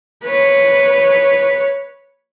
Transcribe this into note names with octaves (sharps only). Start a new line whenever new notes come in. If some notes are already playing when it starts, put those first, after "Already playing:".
B4 C#5